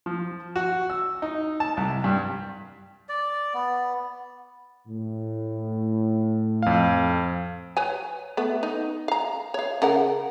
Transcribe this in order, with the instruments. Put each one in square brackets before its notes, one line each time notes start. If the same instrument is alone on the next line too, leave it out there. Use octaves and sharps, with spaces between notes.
[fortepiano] F3
F#4
E6
D#4
A5
C2
G2
[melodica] D5
B3
[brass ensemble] A2
[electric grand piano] F2 F5
[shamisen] B4 C#5 G#5
A3 B3
D#4
F5 A#5
C#5 F5
C#3 A#4 F#5